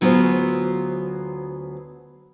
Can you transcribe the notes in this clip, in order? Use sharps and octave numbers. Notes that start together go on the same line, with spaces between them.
D2 F#3 B3 F4 G#4 C5